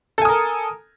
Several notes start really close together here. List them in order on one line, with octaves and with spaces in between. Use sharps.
A4 G#5 D#6 A#4